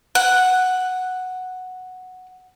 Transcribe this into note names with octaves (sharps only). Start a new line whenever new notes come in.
F#5 F#6